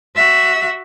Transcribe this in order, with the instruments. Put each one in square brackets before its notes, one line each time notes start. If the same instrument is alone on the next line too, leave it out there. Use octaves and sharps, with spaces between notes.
[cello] F#4 E5